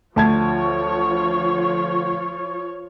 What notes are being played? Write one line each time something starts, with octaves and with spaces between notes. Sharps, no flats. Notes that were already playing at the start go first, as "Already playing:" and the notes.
D2 F3 F4 C#5 A5 G#6